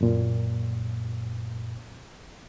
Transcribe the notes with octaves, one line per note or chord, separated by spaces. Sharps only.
F#2 A#2